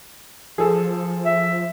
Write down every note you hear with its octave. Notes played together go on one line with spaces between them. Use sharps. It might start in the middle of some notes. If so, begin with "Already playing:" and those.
F3 G#4 A4
E5